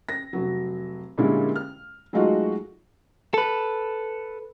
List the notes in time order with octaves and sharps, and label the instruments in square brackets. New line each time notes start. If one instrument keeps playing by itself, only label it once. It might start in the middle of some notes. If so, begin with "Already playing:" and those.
[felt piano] A#6
F1 F#3
A#2 D3 G3 G#3 C#4 E4
F6
F#3 G#3 A3 D#4 F4 F#4
[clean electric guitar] A4 B4